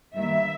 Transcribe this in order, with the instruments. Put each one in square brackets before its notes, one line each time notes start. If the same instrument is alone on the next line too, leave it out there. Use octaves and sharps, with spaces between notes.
[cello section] G2 D#3 G3 A#3 E5